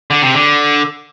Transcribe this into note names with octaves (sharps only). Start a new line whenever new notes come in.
D3
C3
D3